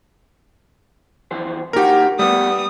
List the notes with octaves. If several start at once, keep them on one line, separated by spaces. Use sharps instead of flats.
F2 E3 C5
D#2 D#3 F#4 G4 A#4
G3 A3 B3 D#6